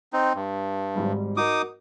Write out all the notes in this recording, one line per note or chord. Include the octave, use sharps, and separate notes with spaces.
C4 D#4
G2
G#1 G#2 G3
D#4 F#4 A#4 D6 D#6